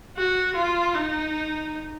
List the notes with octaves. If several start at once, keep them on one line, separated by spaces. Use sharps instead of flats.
F#4
F4
D#4